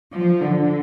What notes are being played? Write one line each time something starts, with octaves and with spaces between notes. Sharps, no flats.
F3
D3